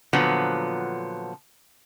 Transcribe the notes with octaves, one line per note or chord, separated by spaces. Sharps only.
A#2 D3 F3 F#3 B3